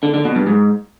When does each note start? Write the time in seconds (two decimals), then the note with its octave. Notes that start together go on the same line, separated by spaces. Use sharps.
0.03 D3
0.14 D3
0.25 B2
0.36 G2
0.47 G#2